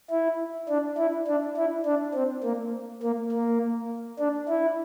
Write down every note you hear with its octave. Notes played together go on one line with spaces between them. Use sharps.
E4
D4
E4
D4
E4
D4
C4
A#3
A#3
A#3
D4
E4